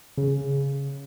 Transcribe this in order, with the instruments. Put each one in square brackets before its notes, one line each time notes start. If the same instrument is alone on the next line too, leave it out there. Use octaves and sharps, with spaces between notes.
[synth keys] C#3